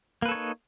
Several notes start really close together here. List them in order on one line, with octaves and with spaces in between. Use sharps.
A#3 B4 A4 C#5 D#4